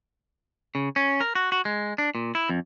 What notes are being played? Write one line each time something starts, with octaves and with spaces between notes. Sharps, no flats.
C#3
C#4
A#4
F#4
F#4
G#3
D4
A#2
E4
F2